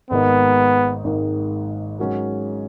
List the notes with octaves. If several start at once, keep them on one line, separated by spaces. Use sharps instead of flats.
G#1 G#2 D#3 A#3 B3 D#4
G#1 G#2 D#3 A#3 D#4
G#2 F#3 C#4 F#4 A#4